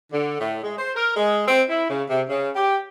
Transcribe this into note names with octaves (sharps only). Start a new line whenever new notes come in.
D3
A2
G#3
C5
A#4
G#3
C4
E4
C#3
C3
C#3
G4